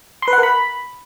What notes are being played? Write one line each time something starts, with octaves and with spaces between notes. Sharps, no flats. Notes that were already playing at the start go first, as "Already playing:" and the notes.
C6
B4
F#5
A#4
B5